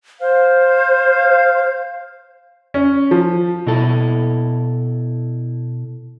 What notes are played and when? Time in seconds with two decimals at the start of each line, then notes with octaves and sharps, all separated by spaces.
0.21 C5 F5
2.74 C#4
3.11 F3
3.67 B2 E4 A4